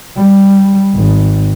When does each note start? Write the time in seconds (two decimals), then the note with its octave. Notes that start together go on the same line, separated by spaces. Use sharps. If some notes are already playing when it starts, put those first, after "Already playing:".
0.16 G3
0.94 G#1